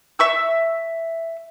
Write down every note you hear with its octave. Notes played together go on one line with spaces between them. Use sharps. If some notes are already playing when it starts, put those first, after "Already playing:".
E5 C#6 E6